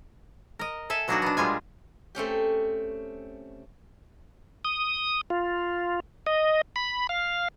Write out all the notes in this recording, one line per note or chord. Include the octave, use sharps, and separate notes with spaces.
A#4 D#5
A4 E5 G#5
B2 F#3 A#3 D4 D#4 F#4
B3 D4
A#2 G3 G#3 F4 G#5
A3 C4 C#4 G4
D#6
F4
D#5
B5
F5